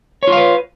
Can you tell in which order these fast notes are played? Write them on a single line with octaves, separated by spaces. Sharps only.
C#5 F4 F5 B4